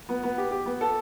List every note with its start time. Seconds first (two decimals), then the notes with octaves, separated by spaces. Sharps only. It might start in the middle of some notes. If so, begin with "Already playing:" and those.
0.09 B3
0.23 B3
0.38 G4
0.51 G4
0.66 B3
0.81 A4